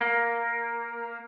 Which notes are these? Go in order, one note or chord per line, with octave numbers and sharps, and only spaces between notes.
A#3